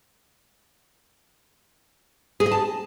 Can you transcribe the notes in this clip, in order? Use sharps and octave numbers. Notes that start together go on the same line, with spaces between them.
G#4
D#5
A5